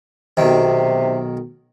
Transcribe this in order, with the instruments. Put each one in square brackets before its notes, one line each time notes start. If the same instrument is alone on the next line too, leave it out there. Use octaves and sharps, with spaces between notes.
[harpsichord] B1 D#3 [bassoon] C3